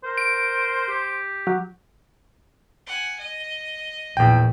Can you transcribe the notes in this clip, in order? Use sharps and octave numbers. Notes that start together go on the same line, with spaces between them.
A#4 C5
D7
G4
F#3
F#5 G#5
D#5
A#1 E2 G5